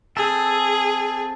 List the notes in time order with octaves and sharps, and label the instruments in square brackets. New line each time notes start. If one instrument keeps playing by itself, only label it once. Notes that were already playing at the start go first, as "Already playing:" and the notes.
[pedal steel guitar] C4 A4 [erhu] G#4